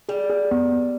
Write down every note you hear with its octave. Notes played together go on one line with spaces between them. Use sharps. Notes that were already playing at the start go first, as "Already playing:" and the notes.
G3 G#4
G#4
B3
B3